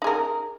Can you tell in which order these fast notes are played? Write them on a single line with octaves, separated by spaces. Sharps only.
D#4 G#4 A#4